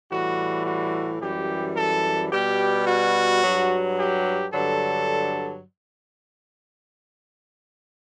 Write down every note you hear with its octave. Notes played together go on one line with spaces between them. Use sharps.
A2 E3 G3 F#4
F#4
F#2 E3 G3 G4
A4
B2 G3 G4
F#4
G2 F#3
G4
G2 D3 F#3 A4